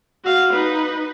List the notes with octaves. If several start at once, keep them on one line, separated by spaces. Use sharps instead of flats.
F#4 F5
D#4 B4